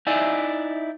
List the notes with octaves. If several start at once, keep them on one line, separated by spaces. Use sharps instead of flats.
D#4 E4 D5 E5 G#5